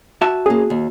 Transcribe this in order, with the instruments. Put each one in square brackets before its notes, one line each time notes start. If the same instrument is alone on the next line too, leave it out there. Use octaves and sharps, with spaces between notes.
[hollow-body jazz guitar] F#4 E5 A5
[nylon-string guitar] A#3 C#4 [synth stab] G#4
[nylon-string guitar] D#2